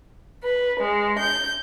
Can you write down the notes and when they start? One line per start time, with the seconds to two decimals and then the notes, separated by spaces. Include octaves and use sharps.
0.43 B4
0.79 G#3
1.19 G6